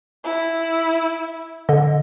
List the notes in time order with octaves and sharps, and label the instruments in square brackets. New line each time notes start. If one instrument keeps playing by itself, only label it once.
[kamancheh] E4
[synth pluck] D3 D#5